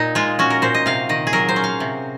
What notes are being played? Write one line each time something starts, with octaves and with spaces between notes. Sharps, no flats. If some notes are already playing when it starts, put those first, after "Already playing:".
Already playing: A#2 D#4
G#3 F4
C#4 F#4
A#4
A#2 C5
D#5
C3 F5
D#3 D#5
G#4
F#3 A#4
C5
C#4
F5
C3